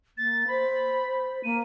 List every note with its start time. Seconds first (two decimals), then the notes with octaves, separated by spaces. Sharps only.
0.18 A#3 A6
0.48 C5 B5
1.44 A#3 D#7